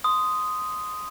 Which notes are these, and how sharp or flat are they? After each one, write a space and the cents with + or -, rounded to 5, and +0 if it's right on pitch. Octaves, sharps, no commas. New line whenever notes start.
C6 -15 D#6 +0